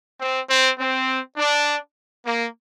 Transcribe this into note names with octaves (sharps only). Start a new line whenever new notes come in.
C4
C4
C4
D4
A#3